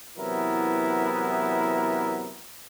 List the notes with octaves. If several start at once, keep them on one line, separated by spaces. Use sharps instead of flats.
C3 E3 F#3 B3 E4 A#4